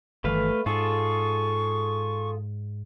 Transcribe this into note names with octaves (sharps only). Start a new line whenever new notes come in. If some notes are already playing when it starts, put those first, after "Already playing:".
G1 D#3 E3 A3 B4 F5
G#2 F4 G#4 A4 C#6